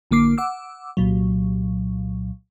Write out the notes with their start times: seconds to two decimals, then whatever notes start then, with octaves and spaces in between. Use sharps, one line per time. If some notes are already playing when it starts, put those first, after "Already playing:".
0.11 A1 D3 A#3 D6 C7
0.38 F#5 D6 E6
0.97 C2 A#2 F#3